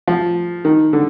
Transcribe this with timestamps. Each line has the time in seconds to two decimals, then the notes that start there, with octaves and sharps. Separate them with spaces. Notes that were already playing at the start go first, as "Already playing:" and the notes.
0.08 F3
0.65 D#3
0.93 D3